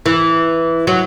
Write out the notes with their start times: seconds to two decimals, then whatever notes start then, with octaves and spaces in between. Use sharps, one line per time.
0.06 E3
0.87 F#3